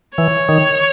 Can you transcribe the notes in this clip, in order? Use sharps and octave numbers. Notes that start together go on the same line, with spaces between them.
E3 C#5
D#3